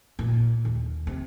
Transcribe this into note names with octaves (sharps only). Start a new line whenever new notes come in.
A#2
D#2
C3